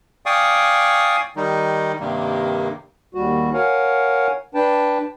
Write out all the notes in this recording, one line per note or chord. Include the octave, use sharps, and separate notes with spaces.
D5 F5 G5 G#5 C#6 D#6
D#3 G3 D#4
G2 C3 D#3 G3 A#3
D#2 G3 F#4
A#4 C#5 F5 F#5 G#5
D4 B4 G5 A5